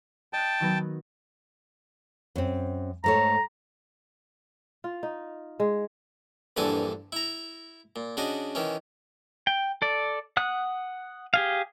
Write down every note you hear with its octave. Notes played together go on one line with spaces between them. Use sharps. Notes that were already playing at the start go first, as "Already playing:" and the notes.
D#5 G5 A5 F#6
D#3 F#3 B3
F#2 C4
G#2 A3 C#5 A#5
F4
D#4
G#3
A#1 G2 D3 E3 A4 G#5
E4 A#5
A#2
C#3 D4 F#4 D#5
D#3 E3 C#4
G5
A4 D5
F#5 D#6 F#6
G4 G#4 F5